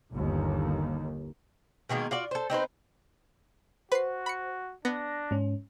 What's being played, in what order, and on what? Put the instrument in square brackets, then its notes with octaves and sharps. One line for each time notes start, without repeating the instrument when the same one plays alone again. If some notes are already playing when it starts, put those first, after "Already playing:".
[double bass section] G1 D#2
[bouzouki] B2 D#3 G#3 A#3
F4 F#4 D5
A4 C5
C4 D#4 B4 C5
[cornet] F#4 [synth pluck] B4 C7 [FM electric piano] C5
[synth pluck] B5 C#7
[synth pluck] B3 [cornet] D4 [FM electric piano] A#6
[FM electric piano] G#2 C#4